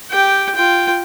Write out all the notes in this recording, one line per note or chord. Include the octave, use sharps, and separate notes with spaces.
G4 G5
F4 G5